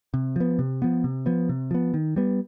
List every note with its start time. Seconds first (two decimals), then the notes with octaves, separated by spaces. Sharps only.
0.14 C3
0.36 F3 B3
0.59 C3
0.82 F3 B3
1.04 C3
1.26 F3 B3
1.49 C3
1.71 F3 B3
1.94 D#3
2.16 G3 B3